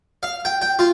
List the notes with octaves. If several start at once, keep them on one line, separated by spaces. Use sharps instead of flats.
F5
G5
G5
F4